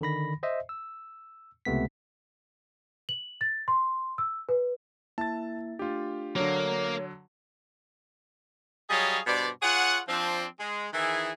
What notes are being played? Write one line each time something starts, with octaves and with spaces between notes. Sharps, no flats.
D3 D#3 B5 A#6
C5 D#5 E5
E6
C#2 C3 A3 B3 B6
F#7
A6
C6
E6
B4
A#3 E4 E5 A5 A6
A3 D4 F4 G4
D3 F#3 A#3 C#5
F#3 G3 G#4 C#5 D#5 F5
G2 B2 C5 D5
F4 G#4 C#5 F#5
F3 C4 D4
G#3
D#3 E3 E4 G#4